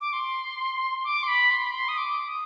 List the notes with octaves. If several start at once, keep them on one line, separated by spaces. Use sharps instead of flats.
D6
C6
D6
C6
B5
C6
B5
C6
D#6
D6
D#6